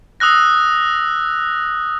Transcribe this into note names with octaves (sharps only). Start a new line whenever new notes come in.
D#6 E6 F#6 A#6